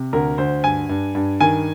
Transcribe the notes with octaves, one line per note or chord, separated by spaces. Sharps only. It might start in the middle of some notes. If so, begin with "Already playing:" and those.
Already playing: C3
D2 A#4
D2 C5
G2 G#5
G2
G2
D#3 G#5